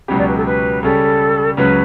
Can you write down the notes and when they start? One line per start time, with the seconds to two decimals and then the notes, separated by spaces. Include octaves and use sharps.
0.08 C#2 B2 F#3 C#4 G4 B5
0.17 D5
0.27 B4
0.36 A4
0.45 B4
0.83 C#3 G3 C#4 G4 A4
1.57 C#2 C#3 F#3 C#4 F#4 B4